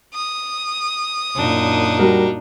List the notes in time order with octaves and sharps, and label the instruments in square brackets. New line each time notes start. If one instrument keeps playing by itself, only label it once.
[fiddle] D#6
[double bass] F#2 A#2 [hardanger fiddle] D4 D#4
[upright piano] G3 F#4 A#4